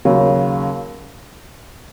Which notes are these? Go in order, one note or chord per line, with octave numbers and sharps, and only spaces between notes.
D#2 C#3 F#3